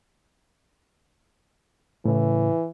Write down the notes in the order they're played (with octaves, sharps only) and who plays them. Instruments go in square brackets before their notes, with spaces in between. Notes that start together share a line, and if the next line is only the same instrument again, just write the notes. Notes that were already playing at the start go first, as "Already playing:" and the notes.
[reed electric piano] A2 C#3 [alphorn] E3